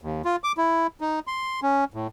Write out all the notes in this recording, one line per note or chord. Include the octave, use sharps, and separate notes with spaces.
D#2
F4
D6
E4
D#4
C6
C#4
A2